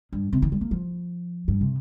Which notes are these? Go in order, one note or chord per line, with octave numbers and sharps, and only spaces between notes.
G2
C3
D#3
G3
A#3
F3
G2
C3